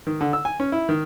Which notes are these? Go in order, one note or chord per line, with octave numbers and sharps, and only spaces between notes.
D#3
D3
E6
G#5
C#4
E4
D#3